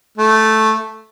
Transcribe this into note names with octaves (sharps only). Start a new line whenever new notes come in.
A3